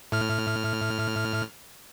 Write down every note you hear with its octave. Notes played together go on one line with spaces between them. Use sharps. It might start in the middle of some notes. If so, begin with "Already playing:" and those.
A2 F6